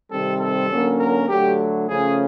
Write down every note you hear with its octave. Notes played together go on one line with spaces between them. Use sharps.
C3 D#3 G3 C4 A4
A4
D3 F#3 A#3 C#4
A#4
D3 F#3 A3 G4
C#3 F3 A3 C#4 G#4